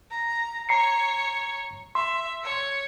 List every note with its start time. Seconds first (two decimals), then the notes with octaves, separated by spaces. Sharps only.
0.11 A#5
0.69 C#5 A#5 C7 C#7
1.95 E5 C6
2.43 C#5